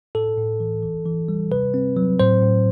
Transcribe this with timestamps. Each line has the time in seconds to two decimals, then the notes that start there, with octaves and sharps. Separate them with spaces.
0.15 A2 A4
0.38 A2
0.60 E3
0.83 E3
1.06 E3
1.28 G3
1.51 C3 B4
1.74 C4
1.97 F#3
2.20 A2 C5
2.42 A2